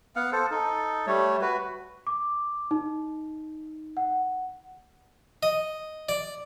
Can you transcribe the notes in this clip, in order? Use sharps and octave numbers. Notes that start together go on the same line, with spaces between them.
B3 F5 F#5
A4 C5
D#4 A4
G3 A3 C#5
F#4 B4
D6
D#4
F#5
D#5
D5